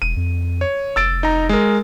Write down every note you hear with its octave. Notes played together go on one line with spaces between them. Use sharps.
E1 D#7
F2
C#5
F1 E6 A6 D7
D#4 A#5
G#3 A#4